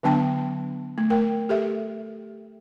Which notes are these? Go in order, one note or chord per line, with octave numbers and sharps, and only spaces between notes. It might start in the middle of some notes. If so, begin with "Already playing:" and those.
D3 F#3 B3 D4 G5 A5
A3
A#4 G5
G4 A4 E5